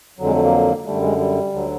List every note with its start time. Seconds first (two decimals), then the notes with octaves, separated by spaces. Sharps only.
0.19 F2 D3 F#3
0.26 G#3
0.35 A3
0.44 A#3
0.86 F#2 D3 G3 A3
1.03 G#3
1.19 G3
1.53 D2 D3 F#3